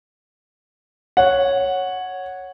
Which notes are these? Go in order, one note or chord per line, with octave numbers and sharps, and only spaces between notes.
C#5 F#5